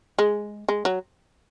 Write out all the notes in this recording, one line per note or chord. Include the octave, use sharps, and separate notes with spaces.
G#3
G#3
F#3